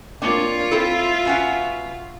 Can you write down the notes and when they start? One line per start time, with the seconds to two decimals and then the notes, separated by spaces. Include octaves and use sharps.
0.22 A#3 C4 D4 F4 C#5
0.71 C4 E4 A4 E5 F5
1.25 B2 C#4 F#5